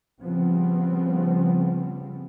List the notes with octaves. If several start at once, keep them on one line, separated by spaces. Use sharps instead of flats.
C#3 F3 G3 B3 C4